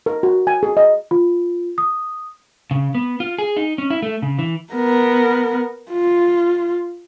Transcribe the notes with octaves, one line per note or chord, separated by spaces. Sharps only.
A#4
F#4
G#5
G#4
D#5
F4
D#6
C#3
B3
F4
G#4
D#4
C#4
E4
A3
C#3
E3
B3 A#4
F4